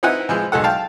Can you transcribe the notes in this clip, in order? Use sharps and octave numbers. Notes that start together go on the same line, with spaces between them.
C4 D#4 E4 B4 F#5 G#5
E3 F3 G#3
B1 G#3 A4 F#5
F5 G5 A5